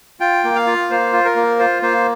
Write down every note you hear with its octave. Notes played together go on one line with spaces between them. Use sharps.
F4 G5
A#3
F5
F4
A#3 C5
F4
A#4
A#3
F4 C5
A#3 C5